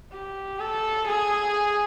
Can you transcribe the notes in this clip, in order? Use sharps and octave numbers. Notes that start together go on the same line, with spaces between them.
G4
A4
G#4